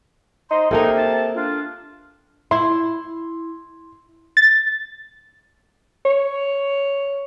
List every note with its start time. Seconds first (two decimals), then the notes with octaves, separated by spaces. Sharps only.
0.51 D#4 C5 D#5 C6
0.71 C3 A#3 D#4 A4 A#4
0.98 A5
1.36 D4 F4
2.51 E4 E5 C6
4.37 A6
6.05 C#5